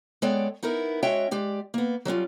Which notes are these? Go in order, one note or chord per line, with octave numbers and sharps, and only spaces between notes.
G#3 B3 A4 C#5 D5 G5
B3 D#4 E4 A#4
G#3 C#4 F#4 C#5 E5 G5
G#3 G4 D5
A#3 B3
F#3 G3 C#4 F4